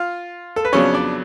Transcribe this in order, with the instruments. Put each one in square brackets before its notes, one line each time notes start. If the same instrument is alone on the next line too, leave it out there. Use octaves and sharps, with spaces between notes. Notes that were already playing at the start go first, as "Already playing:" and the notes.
Already playing: [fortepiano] F4 F5
A4
B4
F2 C#3 F#3 B3 C#4 D4 C#5
D4 D5